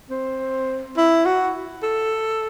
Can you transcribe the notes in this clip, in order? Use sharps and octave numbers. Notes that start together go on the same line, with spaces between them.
C4
E4
F#4
A4